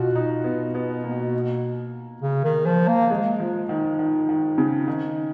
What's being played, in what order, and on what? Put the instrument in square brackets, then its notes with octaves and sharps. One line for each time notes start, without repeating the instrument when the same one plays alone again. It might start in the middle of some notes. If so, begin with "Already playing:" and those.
Already playing: [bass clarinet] B2 [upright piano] D#4 F4 F#4
[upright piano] D#4
[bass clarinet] B2 [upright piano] B3
[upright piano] B3
A#3
[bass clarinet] C#3
D#3
F3
A#3
[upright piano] G#3
F3
D#3
D#3
D#3
C#3
D#3